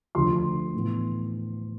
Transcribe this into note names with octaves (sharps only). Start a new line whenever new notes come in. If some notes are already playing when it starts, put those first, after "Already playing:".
D2 D3 F3 C6
A2 E3 B3